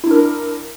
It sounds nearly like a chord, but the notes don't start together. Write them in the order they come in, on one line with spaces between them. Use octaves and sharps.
E4 D4 A#4